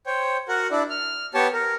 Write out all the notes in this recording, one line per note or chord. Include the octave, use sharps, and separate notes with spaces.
C5 C#5 G5
F#4 A#4 F#5
D4 E4 D5
F6
B3 G4 C#5 A5
A#4